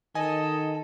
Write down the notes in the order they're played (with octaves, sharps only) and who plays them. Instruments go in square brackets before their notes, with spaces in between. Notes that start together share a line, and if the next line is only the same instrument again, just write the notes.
[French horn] D#3 [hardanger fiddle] A4 [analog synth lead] D#5 [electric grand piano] G#5